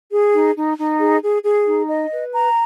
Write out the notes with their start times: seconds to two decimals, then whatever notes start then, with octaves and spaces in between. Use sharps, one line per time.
0.11 G#4
0.32 D#4
0.55 D#4
0.77 D#4
0.99 G#4
1.21 G#4
1.44 G#4
1.66 D#4
1.88 D#5
2.11 B4
2.33 A#5